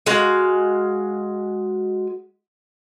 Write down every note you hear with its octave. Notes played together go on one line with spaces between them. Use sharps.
G#3 F#4 F5